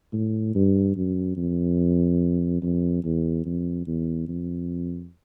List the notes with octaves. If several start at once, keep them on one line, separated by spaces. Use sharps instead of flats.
A2
G2
F#2
F2
F2
E2
F2
E2
F2